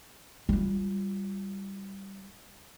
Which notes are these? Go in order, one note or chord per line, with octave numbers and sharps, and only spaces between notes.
G3 F4